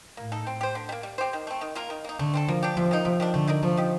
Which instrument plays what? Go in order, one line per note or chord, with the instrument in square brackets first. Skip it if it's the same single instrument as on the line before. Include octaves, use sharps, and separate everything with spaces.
[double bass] A2 [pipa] A#3
[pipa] D#4 A4
C4
G4 C5
D3
G3
A#3
G3
C4 G4 C5
D#3
A3 C4
D#3
A#3 F4 A#4
D#3
A#3 D#4
[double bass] D3 [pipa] A3
[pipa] C4 F4 A4
[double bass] F3 [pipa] A#3
[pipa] D4 G4
[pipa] C3 [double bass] F3
[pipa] D#3 A#3 D#4
[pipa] C3 [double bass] F3
[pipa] D#3 G3 D4
[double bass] D3 [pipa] A3
[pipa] D#4 A#4 D5
[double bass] F3 [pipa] A3
[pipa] D#4 G4